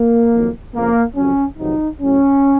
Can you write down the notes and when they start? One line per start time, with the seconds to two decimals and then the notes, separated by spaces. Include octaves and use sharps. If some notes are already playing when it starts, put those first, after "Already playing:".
Already playing: A#3
0.33 F2 D#3 F#3
0.74 F2 C#3 F3 A#3
1.16 F2 C#3 F#3 C#4
1.59 F2 C3 D#3 F#3 D#4
2.01 A2 F#3 C#4